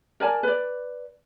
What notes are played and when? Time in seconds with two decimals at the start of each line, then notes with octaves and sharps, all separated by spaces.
0.20 A#4 D5 G#5 A5
0.43 B4 D5